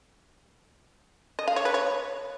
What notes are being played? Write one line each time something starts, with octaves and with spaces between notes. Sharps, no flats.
D#5
F5
C#5
B4
C#5